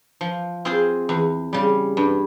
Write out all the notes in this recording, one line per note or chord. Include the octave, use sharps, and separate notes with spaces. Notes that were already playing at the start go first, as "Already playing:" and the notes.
F3
C4 F4 G#4 C5
E2
C#3 G3
G2